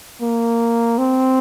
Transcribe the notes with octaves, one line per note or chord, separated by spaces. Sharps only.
A#3
C4